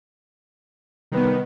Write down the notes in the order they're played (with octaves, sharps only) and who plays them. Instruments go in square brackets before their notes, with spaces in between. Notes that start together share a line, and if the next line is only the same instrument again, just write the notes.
[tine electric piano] C3 G3 B4 [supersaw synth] D#3 B3